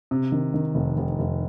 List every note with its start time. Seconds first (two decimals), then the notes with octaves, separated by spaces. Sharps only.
0.11 C3
0.32 D#3
0.54 D#3
0.75 F1
0.97 F1
1.19 F1